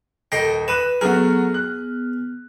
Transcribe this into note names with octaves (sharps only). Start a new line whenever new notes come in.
D#1 A4 D#5 G5 A#6 C7
B4 F#6 D#7 E7
F#3 A3 B3 F#4 G#4 F6
F#6